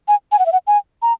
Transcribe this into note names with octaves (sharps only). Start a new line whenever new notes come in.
G#5
G#5
F#5
E5
F#5
G#5
A#5